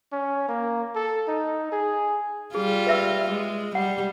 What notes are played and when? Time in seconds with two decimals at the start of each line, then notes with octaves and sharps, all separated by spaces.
0.12 C#4
0.49 A#3
0.95 A4
1.28 D#4
1.72 G#4
2.55 G3 F4 G#4
2.87 B4 E5 E6
3.30 G#3
3.75 G3 F#5